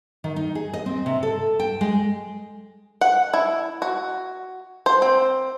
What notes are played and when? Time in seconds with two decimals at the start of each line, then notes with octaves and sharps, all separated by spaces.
0.24 D#3
0.36 D#4
0.55 G#4
0.73 D#5
0.86 C4
1.06 C3
1.23 A4
1.60 G5
1.81 G#3
3.01 F#5
3.34 E4
3.82 F#4
4.86 C5
5.02 C4